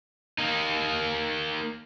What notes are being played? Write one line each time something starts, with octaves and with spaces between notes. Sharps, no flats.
A#3 D#4